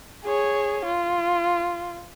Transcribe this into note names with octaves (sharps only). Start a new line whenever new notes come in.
G#4 C#5
F4